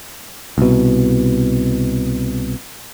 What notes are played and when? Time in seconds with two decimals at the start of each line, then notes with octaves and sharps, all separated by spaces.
0.58 C2 B2